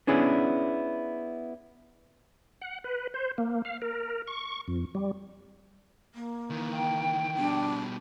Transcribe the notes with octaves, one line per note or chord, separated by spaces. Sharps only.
B3 C#4 D4 E4 G#4
F#5
B4
C5
A#3
F5
A#4
C#6
F2
G3
A#3
D#3 E3
G5
B2 G3 D4